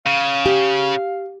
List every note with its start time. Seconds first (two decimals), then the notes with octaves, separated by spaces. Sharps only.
0.06 C#3 F5
0.46 G4